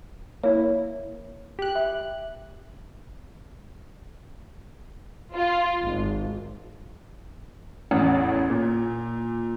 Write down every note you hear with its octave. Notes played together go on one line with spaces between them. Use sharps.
A#3 E4 C#5
G4 F#6
E5
F4
G#1
A1 E2
A#2